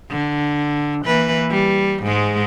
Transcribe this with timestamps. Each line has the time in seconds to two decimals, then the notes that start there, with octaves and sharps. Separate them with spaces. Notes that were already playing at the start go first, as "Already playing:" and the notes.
0.11 D3
1.06 E3 A#3 B4
1.50 G3
2.03 G#2 G#3